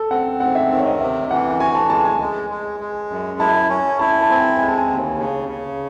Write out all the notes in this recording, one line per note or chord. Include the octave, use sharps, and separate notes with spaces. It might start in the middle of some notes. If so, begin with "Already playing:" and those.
Already playing: A4
C4 F#5
G#2 F#5
E5
D#3
C#5
D#5
C3 E5
E3 F#5
F#5
F#4 G#5
A5
G#3 A5
G#5
G#3
G#3
G#3
F#2
E4 A5
C#4
E4 A5
A5
C4 G#5
G#3 G#5
A5
G#5
D#2
C#3
C#3